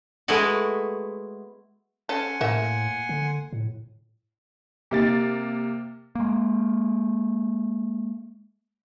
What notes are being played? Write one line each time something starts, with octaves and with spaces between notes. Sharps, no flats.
G#3 A3 B3 E4 F#4
C#4 A4 F#5 G#5 C6
A2 A3 A#3 E5
D3
A2
C3 A#3 A6
G#3 A#3